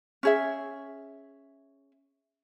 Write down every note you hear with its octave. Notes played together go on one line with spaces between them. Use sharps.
C#4 G#4 E5